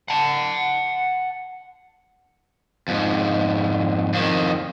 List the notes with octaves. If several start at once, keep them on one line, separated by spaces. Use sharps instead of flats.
F#5 A5
F2 G#2
F2 D#3